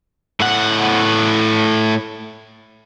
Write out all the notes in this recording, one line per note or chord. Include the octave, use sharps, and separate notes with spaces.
A2 F#5